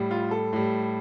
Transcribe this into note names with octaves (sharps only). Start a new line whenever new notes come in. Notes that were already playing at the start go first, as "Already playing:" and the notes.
Already playing: A2 G3
F4
A4
A2 G3